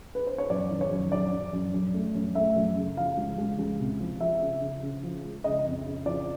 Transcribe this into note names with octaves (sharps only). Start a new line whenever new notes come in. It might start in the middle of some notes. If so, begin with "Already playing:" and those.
B4
C5
C#5
F#2 D5
D#3
C#5
F#2
F#2 D5
F#2
F#2
F#2
A3
F#2
A3 E5
F#2
C#3
F3 F5
C#2
C#2
C#2
C3
F3
F3 E5
C#3
C#3
C#3
F3
G#3
C#3 D#5
F2
C#3
F3 D5